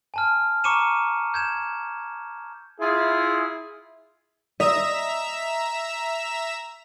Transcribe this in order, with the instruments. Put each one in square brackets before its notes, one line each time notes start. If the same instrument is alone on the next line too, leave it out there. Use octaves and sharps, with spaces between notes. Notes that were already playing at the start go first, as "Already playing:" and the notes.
[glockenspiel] G#5 A5 F6
A#5 C#6 D6 C#7 D#7 E7
G6 G#6 E7
[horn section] E4 F4 G#4
[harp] D#5 [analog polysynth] E5 A#5 E7